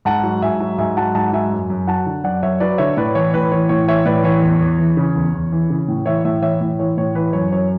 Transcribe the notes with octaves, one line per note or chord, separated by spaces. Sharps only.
G#2 F#5 A5
F#3
G#2 E5 G#5
F#3
G#2 E5 G#5
F#3 F#5 A5
G#2 F#5 A5
F#3 E5 G#5
F#2
F#2
F#3 F#5 A5
D3
F#2 D5 F#5
F#2 C#5 E5
F#3 B4 D5
D3 C#5 E5
A2 B4 D5
E3 C#5
A2 B4
E3 C#5
A2 C#5
E3 C#5 E5
A2 B4 D5
E3 C#5
E2
E2
E3
C#3
E2
E2
E3
C#3
A2
E3 C#5 E5
A2 C#5 E5
E3 C#5 E5
A2
E3 C#5
A2 C#5
E3 B4
F#2 C#5
F#2 C#5